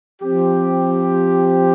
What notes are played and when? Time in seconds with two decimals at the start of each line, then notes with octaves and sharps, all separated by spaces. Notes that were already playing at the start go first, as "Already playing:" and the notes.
0.22 F3 C4 G4